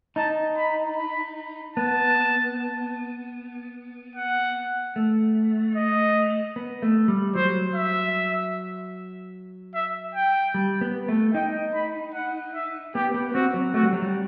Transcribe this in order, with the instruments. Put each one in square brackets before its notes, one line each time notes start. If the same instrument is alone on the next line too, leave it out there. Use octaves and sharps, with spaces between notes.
[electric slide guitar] D#4 [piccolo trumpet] A5
[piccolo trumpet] B5
B5
[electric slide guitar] B3 [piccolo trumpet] A5
[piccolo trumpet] F#5
[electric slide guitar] A3
[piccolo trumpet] D#5
[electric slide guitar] B3
A3
G3
[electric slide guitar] F#3 [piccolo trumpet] C5
[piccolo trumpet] E5
E5
G5
[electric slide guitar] G3
B3
A3
[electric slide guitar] D#4 [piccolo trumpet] G5
[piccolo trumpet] B5
F#5
E5
[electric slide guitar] B3 [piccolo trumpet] G4
[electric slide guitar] B3
[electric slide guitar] C4 [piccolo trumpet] F#4
[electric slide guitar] F#3
[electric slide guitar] A3 [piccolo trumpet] F#4
[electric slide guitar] G3
F#3
G3